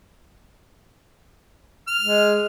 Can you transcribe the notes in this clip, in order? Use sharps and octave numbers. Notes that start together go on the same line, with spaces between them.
F6
G#3